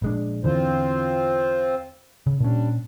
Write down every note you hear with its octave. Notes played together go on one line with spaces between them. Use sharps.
A#1 G#3 D4
E2 D3 E3 C4 F4 C5
C#3
A#2 G3 C#4 D4